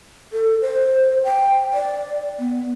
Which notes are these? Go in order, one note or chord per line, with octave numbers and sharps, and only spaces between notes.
A4
C5
G5
D5
B3